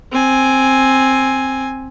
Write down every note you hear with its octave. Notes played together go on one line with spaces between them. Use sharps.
C4 G#5